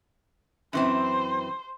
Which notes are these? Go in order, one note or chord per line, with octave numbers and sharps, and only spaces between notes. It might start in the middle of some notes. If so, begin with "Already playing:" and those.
F#2 E3 C4 C5